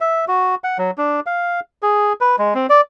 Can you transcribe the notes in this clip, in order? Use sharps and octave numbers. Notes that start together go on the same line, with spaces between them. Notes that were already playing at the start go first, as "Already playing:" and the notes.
E5
F#4
F#5
F#3
D4
F5
G#4
B4
G#3
C4
D5